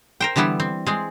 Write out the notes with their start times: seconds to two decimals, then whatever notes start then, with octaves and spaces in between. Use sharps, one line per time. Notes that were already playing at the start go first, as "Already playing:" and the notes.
0.20 A#4 C5 G5
0.36 D3 E3 G3 B3 E4
0.60 C4
0.87 G#3 C4 G#4